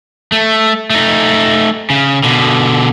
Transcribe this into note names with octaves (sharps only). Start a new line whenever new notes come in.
A3
A3 D#4
C#3
B2 D3